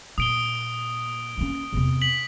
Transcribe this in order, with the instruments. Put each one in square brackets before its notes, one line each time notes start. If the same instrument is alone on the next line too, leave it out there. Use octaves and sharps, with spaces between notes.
[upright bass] A#2 [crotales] D#6 D7 G7
[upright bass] A#3 C#4
E2 C3
[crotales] B6 F#7